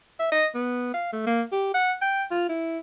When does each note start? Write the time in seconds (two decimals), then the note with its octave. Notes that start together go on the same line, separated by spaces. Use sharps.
0.19 E5
0.32 D#5
0.54 B3
0.94 F5
1.13 A3
1.26 A#3
1.52 G4
1.74 F#5
2.01 G5
2.31 F4
2.49 E4